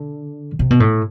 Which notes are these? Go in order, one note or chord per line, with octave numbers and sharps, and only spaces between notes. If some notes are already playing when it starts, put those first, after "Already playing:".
Already playing: D3
C3
B2
A2